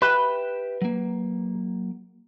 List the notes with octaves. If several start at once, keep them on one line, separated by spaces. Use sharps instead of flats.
G4 B4 E5 G5
F#3 A#3